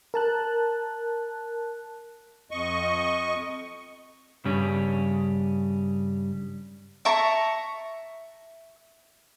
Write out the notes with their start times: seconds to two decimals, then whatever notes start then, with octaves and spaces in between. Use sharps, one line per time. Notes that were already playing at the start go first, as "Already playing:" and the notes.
0.14 A#4 A5 F#6
2.51 F2 D#5 C#6
4.45 G2 C#3 G3 C#4
7.05 E5 A5 A#5 C#6